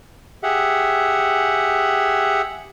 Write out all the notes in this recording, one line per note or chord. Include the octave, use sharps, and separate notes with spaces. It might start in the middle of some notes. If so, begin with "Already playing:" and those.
G4 G#4 E5 F#5